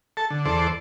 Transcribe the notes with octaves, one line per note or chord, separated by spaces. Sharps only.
A4 A5
D3
E2 A4 C5 D5